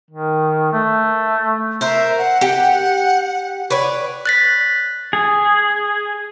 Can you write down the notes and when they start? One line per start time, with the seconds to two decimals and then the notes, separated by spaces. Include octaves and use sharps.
0.11 D#3
0.73 A3
1.81 A#4 C5 E5
2.18 F#5
2.41 G4 F#5 G5
3.70 B4 C#5 D5
4.26 F#6 A6 B6
5.13 G#4